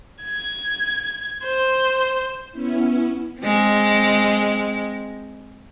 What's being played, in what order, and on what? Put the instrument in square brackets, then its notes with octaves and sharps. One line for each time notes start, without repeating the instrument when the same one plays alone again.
[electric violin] G#6
C5
[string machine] B3 C#4 E4
[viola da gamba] G#3 C4